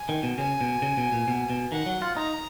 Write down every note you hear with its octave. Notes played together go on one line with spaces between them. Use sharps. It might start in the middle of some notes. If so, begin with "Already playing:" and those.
Already playing: G#5
D#3
B2
C#3 G#5
B2
C#3
B2
A#2
B2
B2
D#3 F#5
F#3
F4
D#4 A#5